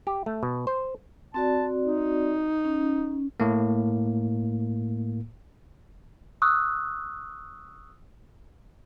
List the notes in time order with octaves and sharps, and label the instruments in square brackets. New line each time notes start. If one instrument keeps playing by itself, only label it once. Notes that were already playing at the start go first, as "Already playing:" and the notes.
[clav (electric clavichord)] G4
A3
B2
C5
[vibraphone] C4 F#4 D5 [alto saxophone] A5
[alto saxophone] D#4
[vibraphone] C#4
[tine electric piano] A2 A#3
[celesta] C#6 D#6 E6 F#6